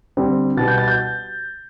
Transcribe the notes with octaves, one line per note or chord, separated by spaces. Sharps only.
D3 G3 C4
B2 G3 B3 A6
G6
A6
G6